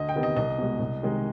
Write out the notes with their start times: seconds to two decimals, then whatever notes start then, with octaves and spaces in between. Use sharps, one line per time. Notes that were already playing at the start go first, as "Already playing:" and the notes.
Already playing: D2 D#5
0.09 G5
0.15 C3 D#3 B3
0.23 D#5
0.36 C2 D#5
0.58 B2 G#3
0.80 C2
1.02 C3 D#3 G#3